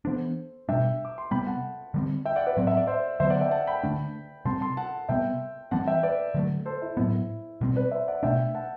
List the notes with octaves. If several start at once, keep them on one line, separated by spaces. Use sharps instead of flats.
E3 B3 D4 A4 C5
B2 G3 D4 E5 G5
D6
C6
C3 G3 B3 G5 B5
F#5 A5
D3 G3 C4
E5 G5
D5 F#5
B4 D5
A2 F#3 C4 F#5
E5
D5
C5 E5
D3 F#3 B3 C5 E5
D5 F#5
E5 G5
F#5 A5
G5 B5
D3 A3 D4
C3 G3 C4 A5 C6
A5 C6
F#5 A5
C3 G3 B3 E5 G5
E3 G3 C4 F#5 A5
E5 G5
B4 D5
D3 F#3 A3
A4 C5
E4
A2 F#3 B3 E4
B2 G3 C4
B4 D5
C5 E5
D5 F#5
B2 A3 D4 E5 G5
F#5 A5